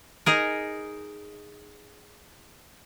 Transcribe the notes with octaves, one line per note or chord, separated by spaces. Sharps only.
D#4 G#4 A#4